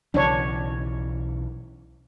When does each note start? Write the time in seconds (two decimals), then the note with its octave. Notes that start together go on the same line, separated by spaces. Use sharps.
0.14 B1 C#3 E3 D4 C#5